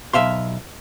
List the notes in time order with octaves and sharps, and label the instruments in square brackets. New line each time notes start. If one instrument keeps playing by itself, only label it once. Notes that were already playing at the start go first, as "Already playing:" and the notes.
[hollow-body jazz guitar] B1 F#2 E5 F5 C6